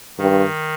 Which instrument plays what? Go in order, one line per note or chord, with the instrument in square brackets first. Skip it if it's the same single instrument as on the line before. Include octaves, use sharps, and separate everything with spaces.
[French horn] G2 [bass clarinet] D#3